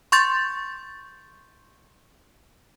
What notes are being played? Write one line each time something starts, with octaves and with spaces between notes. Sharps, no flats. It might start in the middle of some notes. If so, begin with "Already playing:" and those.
C6 C#6 G6 A6